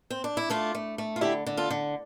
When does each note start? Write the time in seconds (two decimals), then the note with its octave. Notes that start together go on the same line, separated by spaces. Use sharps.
0.10 C4
0.24 D4
0.37 E4
0.50 A3 D4 F4
0.75 A3
0.98 A3
1.16 F4
1.21 D3 E4 G4
1.46 D3
1.57 F4 A4
1.70 D3